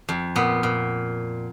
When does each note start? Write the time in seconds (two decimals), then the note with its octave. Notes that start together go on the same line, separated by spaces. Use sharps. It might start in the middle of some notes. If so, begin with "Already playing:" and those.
0.09 F2
0.36 A#2 B3
0.63 A#2